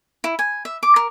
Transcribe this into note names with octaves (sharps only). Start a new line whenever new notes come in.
E4
G#5
E5
D6
A#4